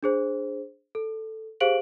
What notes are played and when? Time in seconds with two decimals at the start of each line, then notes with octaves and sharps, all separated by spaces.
0.03 D4 G#4 C5
0.95 A4
1.61 G4 G#4 C5 F5 D7 F#7